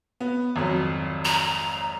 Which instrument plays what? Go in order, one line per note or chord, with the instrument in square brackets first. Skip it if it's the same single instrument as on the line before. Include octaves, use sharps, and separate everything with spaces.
[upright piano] B3
G#1 F2 F#3
[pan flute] A#5